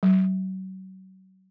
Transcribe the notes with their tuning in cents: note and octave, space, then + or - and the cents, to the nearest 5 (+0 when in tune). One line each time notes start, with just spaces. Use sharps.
F#3 +35